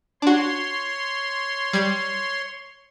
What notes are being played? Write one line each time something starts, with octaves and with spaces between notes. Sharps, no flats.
D4 F#4 C#5 C6
G3 G#6